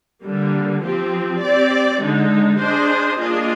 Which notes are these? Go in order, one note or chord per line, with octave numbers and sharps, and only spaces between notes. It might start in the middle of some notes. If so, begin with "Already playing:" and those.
D3 G3 A#3
F3 C4 G4
C4 G4 D5
D3 G#3 D#4
D4 G#4 C5 D#5
A#3 D4 F4 G#4 D#5